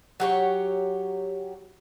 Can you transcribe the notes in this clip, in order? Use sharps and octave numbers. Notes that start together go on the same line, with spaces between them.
F#3 G4 C#5